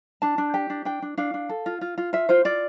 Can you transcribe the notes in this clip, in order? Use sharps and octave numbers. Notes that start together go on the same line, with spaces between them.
D4 A5
D4
G4 G5
D4
D4 G5
D4
D4 F5
D4
A4
F4
F4
F4
F4 E5
F4 C5
F4 D5